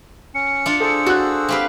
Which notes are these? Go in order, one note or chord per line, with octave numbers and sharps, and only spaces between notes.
C#4 C#7
D4 F4
G#4 A4 C5 E6
F#4 A4 F#6
C4 G4 B4 F5